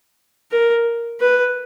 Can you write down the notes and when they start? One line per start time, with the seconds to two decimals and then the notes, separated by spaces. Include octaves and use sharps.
0.51 A#4
1.20 B4